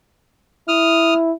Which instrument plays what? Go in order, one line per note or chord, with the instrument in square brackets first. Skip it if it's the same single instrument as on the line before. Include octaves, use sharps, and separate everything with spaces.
[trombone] E4 [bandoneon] D#6 F6